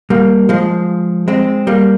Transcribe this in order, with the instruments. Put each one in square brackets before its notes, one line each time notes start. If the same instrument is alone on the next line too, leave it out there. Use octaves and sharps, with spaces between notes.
[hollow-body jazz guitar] G3 A#3
F3 G#3
G#3 C4
G3 A#3